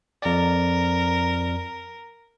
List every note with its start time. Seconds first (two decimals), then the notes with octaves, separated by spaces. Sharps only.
0.22 F2 A#4 D5